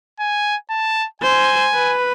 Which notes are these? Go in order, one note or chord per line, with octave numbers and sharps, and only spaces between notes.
G#5
A5
C5 G#5
B4